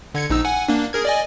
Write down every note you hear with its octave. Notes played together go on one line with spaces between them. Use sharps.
D3 G#6 C#7
A#1 D#4 E6
F#5 G#5
A#3 D4
G#4 A#4 G#6
D5 D#5 G#5